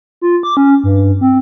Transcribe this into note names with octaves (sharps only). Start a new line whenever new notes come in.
F4
D6
C#4
G2
C4